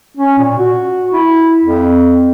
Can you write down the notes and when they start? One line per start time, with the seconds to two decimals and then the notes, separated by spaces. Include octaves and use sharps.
0.17 C#4
0.39 A#2
0.58 F#4
1.12 E4
1.63 F2